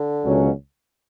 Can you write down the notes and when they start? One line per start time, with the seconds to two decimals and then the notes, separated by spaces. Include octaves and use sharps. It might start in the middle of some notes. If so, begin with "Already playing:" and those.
Already playing: D3
0.24 C#2 B2 F#3 C#4